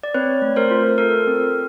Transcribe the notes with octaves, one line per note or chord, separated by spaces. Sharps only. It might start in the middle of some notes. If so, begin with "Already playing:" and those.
D5
C4 B4 C#5
A3
A#4 C5
F4
A4 A#4
C4